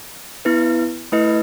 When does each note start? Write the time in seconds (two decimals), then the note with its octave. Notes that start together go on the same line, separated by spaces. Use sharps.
0.45 B3 E4 B4
1.12 A3 E4 B4 D#5